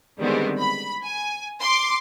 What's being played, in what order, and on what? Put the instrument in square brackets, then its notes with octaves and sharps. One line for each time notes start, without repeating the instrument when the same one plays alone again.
[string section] D3 D#3 G3 G#3 B3 C4
B5
G#5
C6 D6